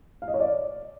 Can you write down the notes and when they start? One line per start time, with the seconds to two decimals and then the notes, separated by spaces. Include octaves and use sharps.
0.22 F5
0.28 D#5
0.34 C#5
0.40 D5